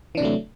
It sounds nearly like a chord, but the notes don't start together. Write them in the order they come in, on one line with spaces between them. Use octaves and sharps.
E3 D4 C3 F#3 A3